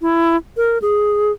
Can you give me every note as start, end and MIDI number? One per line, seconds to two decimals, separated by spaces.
0.01 0.36 64
0.57 0.78 70
0.82 1.32 68